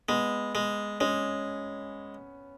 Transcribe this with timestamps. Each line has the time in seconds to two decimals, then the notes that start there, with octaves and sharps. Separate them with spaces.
0.08 G#3 B3
0.55 G#3
1.01 G#3 C#4